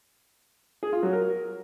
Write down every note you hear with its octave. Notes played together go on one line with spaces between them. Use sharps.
G#4
F4
F#3
A#4